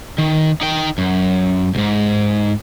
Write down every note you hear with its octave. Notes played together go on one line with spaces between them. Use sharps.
D#3
D#4 G5
F#2
C#2 G#2